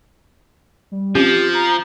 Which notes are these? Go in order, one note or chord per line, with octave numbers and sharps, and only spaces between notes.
G3
F3 C4 C#4 G4
A#5